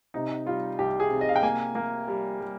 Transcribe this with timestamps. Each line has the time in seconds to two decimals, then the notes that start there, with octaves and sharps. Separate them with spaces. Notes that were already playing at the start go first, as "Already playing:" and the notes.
0.14 C3 D#4
0.46 G3 F4
0.79 C2 G4
1.00 G#4
1.11 C3
1.21 D#5
1.29 F5
1.36 G5
1.43 A#3 G#5
1.75 A#3
2.08 G3
2.40 G3